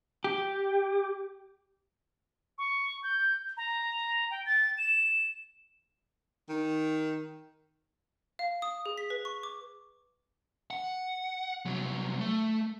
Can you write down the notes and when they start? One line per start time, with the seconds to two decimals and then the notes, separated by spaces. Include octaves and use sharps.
0.24 G4
2.58 C#6
3.03 G6
3.57 A#5
4.31 G5
4.46 A6
4.78 E7
6.49 D#3
8.39 F5
8.62 D#6
8.86 G#4
8.98 B6
9.10 B4
9.25 C#6
9.43 D6
10.70 F#5
11.65 C2 F#3
12.21 A3